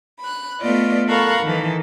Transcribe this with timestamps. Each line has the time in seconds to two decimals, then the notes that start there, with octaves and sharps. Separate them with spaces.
0.20 B5 F#6
0.61 A3 B3 F4 D5 D#5
1.07 A4 A#4 F5 F#5 B5 C#6
1.43 D#3 E3 A4